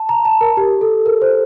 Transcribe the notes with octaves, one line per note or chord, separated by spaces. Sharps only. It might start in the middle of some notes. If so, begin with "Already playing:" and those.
Already playing: A5
A#5
A5
A#4
G4
A4
A#4
C5